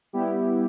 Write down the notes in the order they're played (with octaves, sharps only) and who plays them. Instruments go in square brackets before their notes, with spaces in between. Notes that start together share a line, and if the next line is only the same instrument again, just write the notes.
[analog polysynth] G3 B3 E4 G4